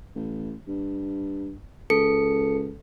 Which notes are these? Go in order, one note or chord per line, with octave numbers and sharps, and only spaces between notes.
A1
G2
C#2 A4 C#7